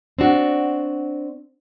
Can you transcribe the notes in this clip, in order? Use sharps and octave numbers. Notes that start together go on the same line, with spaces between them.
C4 D4 F#4